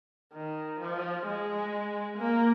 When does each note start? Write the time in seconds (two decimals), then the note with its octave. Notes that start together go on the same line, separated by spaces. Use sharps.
0.33 D#3
0.80 F3
1.27 G#3
2.18 A#3